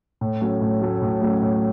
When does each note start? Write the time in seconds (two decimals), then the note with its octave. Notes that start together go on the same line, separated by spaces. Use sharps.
0.21 A2
0.41 F#3 A3 C#4
0.61 A2
0.81 F#3 A3 C#4
1.02 A2
1.22 F#3 A3 C#4
1.42 A2